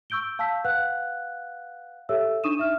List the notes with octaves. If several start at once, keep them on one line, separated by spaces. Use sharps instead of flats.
C#6 E6 G6 D7 G7
F5 A5 E6 G6 B6
B4 F5 F#5 F#6
G4 A4 C#5 E5 E6
D4 D#4 C#6 D#6 D#7 E7
E5 F6